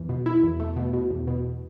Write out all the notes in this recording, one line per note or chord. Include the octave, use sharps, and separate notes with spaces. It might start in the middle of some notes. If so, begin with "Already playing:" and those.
Already playing: E2
B2
E4
E2
A3
B2
B2
E2
B2